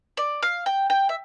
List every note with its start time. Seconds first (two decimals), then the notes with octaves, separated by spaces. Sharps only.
0.17 D5
0.43 F5
0.66 G5
0.90 G5
1.09 E5